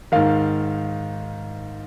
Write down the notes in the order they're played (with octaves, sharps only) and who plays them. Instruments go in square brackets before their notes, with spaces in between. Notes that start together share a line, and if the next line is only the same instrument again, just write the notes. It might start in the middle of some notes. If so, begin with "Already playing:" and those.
[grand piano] G#2 D#3 F5